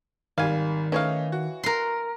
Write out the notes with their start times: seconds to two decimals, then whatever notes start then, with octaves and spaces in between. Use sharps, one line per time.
0.38 G#1 D#3 G3 F5 G#5
0.92 E3 A3 C#4 D#4 C#5 F5
1.32 F#4
1.63 A#4 C6